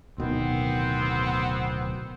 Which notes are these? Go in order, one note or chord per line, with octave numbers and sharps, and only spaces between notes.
D1 B2 D#3 B3 C4